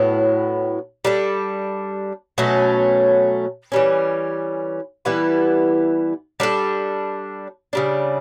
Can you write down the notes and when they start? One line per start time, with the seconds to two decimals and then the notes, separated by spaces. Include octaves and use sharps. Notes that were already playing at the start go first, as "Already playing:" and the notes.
Already playing: A2 F#3 B3 E4
1.05 G3 D4 A4
2.38 B2 F#3 A3 C#4
3.72 E3 G3 C#4
5.05 E3 G3 B3 E4
6.40 G3 D4 A4
7.73 C#3 G3 D4